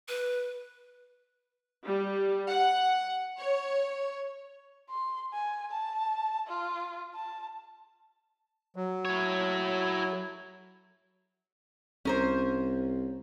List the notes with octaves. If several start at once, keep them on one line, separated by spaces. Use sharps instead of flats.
B4
G3
F#5
C#5
C6
G#5
A5
F4
A5
F#3
E4 C#5
C2 C#4 A#4 C5